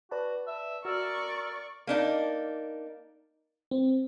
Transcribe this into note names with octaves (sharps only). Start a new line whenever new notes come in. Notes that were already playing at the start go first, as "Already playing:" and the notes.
F#4 B4 D5 A5
E5
F#4 A#4 D5 C#6 E6
A#3 D4 D#4
C4